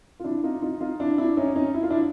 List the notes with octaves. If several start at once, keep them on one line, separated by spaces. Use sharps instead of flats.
F4
D4 E4
D#4 F4
D#4 F4
D#4 F4
D4 E4
D4 E4
C#4 D#4
C#4 D#4
E4
F4
D4 E4